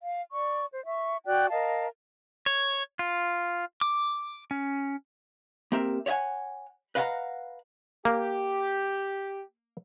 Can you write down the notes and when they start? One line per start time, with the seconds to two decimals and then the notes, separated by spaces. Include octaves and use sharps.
0.04 F5
0.31 D5 C#6
0.72 C5
0.86 E5 C#6
1.26 F#4 D5 G5 F#6
1.51 A#4 D#5 F5 A5
2.46 C#5
2.99 F4
3.81 D6
4.51 C#4
5.72 A#3 C4 G4 A#4 E5
6.06 C#5 D5 E5 F#5 G#5
6.95 B4 D#5 F5 F#5 G#5 A#5
8.05 A#3 G4